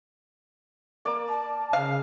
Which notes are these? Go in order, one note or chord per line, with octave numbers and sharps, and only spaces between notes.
A#3 D5 D6
A5
C#3 F5